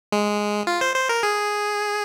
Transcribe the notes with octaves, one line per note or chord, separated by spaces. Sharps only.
G#3
F4
C5
C5
A#4
G#4